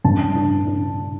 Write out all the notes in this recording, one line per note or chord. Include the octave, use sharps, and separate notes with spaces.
G2 A5
D4
D4